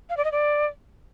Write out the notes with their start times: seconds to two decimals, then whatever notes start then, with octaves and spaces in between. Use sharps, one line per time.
0.10 F5
0.17 D5
0.24 D#5
0.32 D5